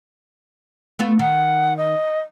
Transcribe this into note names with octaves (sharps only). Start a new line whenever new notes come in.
A3 B3 F4
D#3 F#5
D#5